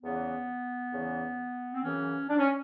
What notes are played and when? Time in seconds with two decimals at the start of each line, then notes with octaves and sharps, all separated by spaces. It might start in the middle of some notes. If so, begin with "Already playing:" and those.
0.03 E2 C#3 E3 B3
0.93 E2 C#3 E3
1.74 C4
1.83 F#2 C#3 E3 C#4
2.30 D4
2.39 C#4